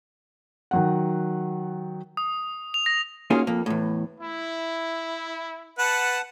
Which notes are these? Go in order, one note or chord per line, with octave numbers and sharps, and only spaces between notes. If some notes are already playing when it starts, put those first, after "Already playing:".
D#3 F#3 F#5
D#6
F7
A#6
A#3 C#4 D#4 F4 F#4 G#4
F2 A#3
E2 A2
E4
B4 F#5 A5